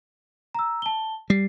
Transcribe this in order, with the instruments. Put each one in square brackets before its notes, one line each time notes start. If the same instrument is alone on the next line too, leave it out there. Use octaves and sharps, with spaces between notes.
[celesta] A#5 E6
A5 G7
[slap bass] G3 [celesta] C7